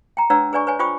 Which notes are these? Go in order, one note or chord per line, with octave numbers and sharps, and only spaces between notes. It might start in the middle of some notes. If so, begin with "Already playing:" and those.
G5 A#5
D4 B4 C#5 F#5 A#5 E6
G#4 B4 D5 G#5 C#6
B4 C#5 G#5
F4 C5 G5 B5 C#6 D#6